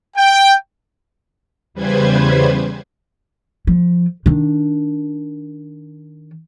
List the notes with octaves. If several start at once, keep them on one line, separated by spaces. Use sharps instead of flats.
G5
E2 C#3 G3 B4 C5 G#6
F3
D#3 D4